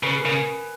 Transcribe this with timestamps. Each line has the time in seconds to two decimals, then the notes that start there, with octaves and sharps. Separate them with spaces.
0.03 C#3 B4
0.15 G#4
0.20 A#4
0.25 C#3